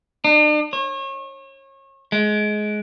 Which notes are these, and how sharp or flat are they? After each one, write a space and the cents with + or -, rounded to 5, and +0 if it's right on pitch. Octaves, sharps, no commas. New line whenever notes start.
D4 +45
C#5 -35
G#3 +20